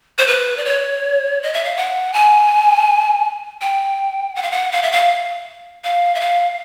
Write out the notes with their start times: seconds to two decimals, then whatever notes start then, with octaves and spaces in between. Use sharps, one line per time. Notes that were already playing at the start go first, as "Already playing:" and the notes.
0.18 C5
0.27 B4
0.57 D5
0.65 C#5
1.43 D#5
1.53 E5
1.65 F5
1.77 F#5
2.13 G#5
3.61 G5
4.35 F#5
4.43 F5
4.52 F#5
4.72 F5
4.83 E5
4.92 F5
5.84 F5
6.15 E5
6.21 F5